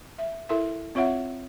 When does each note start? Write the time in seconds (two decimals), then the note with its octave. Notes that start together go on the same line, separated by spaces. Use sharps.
0.18 E5
0.49 E4 A4 A#4 E5
0.95 C4 F4 C#5 E5 F#5